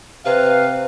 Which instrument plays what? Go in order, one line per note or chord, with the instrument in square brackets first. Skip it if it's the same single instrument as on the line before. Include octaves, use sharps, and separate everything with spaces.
[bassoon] C3 [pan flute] B4 [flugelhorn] F5